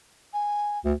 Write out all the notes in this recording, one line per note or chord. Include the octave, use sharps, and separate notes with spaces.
G#5
D2